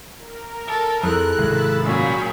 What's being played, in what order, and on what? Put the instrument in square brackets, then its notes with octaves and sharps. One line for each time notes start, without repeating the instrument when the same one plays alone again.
[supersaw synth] A#4
[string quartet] A4
[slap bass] F2 F3 [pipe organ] E4 G#4 A4 [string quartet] F#6
[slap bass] G#1 C3 G#3 [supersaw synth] B5 E6 A6
[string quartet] A#2 F#3 G#4 [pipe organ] C#4 [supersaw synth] F5 G5 B5